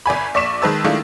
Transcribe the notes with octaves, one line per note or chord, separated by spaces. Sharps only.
G1 D5 G#5 B5
A#1 D5 C#6 B6 E7
D#3 G#3 B4 A5 E6
D#3 G#3 A3 D4 E4 F4